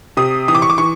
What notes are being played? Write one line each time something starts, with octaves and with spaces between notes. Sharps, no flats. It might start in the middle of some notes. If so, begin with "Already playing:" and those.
C3 D#6
E3 D#6
D6
C#6
D6
E3 C#6